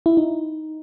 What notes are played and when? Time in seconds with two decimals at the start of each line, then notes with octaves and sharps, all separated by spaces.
0.06 E4
0.17 D#4